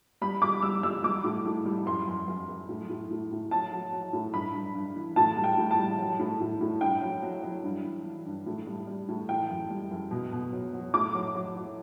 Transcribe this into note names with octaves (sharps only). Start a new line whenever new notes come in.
G3 B5
G3 D6
G3 E6
G3 E6
G3 D6
A2
A2
G3
F#2 C6
F#2
F#2
F#2
A2
A2
A2
A2
F#3 A5
F#3
F#3
A2
G2 B5
G2
G2
E3
A2 A5
G3
G5
A2
A5
G3
F#3
A2
A2
A2
G2 G5
F#3
F#3
F#3
G2
E3
E3
G2
A2
G3
G3
A2
E3 G5
F#2
G3
F#2
B2
B2
F#3
F#3
A2 D6
F#3
F#3
F#3